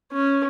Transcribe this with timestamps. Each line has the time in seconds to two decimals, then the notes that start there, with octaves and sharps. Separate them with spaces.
0.13 C#4